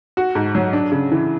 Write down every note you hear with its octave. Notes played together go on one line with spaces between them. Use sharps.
F#4
G#2
F#3
D4
C#3
E3